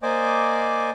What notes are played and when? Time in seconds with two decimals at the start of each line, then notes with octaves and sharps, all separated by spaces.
0.03 A#3 C5 D5 D#5 G#5 D6